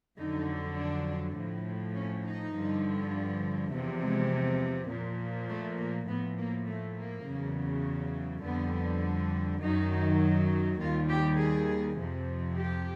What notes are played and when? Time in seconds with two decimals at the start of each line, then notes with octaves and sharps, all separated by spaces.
0.18 F2 D3 F#3 D#4
0.77 D4
1.36 A2 F3
1.95 C#4
2.25 D#4
2.54 G2 D3 F3
3.72 E2 C3 F3 A3
4.01 G#3
4.90 A#2 F3
5.49 A3
5.78 A#3
6.07 A2 F3 B3
6.37 A#3
6.67 A3
6.96 A#3
7.26 E2 C#3 F#3
8.43 F2 D3 G3 B3
9.61 F#2 D#3 F#3 D#4
10.80 D#2 D#3 G3 F4
11.09 G4
11.38 G#4
11.98 F2 C3 F3
12.56 G4